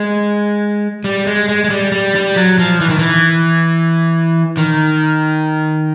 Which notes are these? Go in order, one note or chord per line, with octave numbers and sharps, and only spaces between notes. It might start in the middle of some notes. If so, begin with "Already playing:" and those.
Already playing: G#3
G3
G#3
G#3
G#3
G3
G3
G3
F#3
F3
E3
D#3
E3
D#3